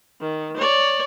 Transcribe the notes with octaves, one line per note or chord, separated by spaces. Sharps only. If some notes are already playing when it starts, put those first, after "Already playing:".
D#3
C#5 D5